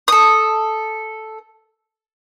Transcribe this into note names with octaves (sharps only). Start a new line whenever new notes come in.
A4 D#6